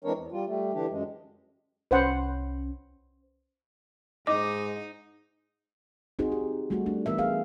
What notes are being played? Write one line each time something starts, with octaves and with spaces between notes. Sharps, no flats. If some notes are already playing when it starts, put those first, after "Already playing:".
E3 G#3 C4 D4 A#4 C#5
E2
G3 F4
G3 A3
D3 E3 D4 G4
F#2 G#3
C2 C#4 B4 C5 F#5
G#2 D#4 D#5 D6
C4 D#4 F#4 G#4 C5
G4
G3 A3 D#4 F#4
A3 D4
E3 A3 B3 A#4 E5
G#4 A#4 F5